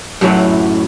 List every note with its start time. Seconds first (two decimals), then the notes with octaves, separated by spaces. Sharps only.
0.21 F#2 A2 E3 F#3